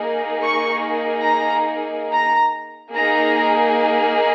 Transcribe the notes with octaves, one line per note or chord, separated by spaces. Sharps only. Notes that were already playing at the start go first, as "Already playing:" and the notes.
Already playing: A#3 D#4 G#4
C#6
A#5
A#5
A#3 D#4 G#4 A#5